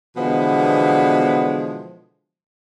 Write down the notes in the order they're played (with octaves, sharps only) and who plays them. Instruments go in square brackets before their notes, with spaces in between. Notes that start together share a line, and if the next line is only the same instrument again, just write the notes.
[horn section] B2 D3 E3 F3 G#3 B3